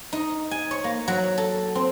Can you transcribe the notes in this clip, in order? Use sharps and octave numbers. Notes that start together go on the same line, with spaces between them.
D#4
G#5
C#5
A#3
F#3
A4
C4